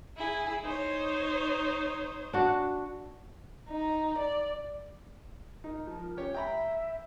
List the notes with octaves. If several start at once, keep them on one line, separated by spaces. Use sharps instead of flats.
E4 G#4
D#4 C5 C#5
D4 F#4
D#4
D5
D#4 A#4
F3
C#4 G4 C#5
E5 G5 A#5 B5